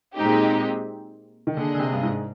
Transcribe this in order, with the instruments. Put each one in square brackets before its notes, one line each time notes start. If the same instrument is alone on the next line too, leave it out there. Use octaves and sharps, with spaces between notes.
[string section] A#2 G#3 C4 D#4 G4
[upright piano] D#3
[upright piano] D3 [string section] A#3 D4 G#4 D#5
[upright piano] D3
C3
G2
G#2